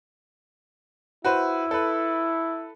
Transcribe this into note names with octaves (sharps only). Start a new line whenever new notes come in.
E4 F#4 B4 C5
A4 B4